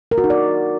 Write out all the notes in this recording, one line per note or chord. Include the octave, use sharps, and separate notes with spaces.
A#4
F#4
D#4
D5